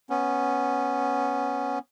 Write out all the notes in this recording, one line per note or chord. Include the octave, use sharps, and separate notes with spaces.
B3 C#4